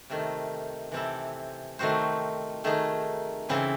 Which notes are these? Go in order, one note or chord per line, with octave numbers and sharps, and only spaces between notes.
C3 D#3 A3
C3 E3 C4 E4 A4
D#3 A3 C4 F#4 C5
D#3 A3 D#4 G#4
C#3 E3 C4 E4 G#4